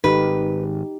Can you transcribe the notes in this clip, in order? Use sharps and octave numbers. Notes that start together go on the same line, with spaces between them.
G#1 D#4 G4 B4